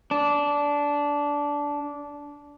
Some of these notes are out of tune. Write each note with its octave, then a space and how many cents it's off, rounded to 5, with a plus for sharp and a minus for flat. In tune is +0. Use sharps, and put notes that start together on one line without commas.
D4 -15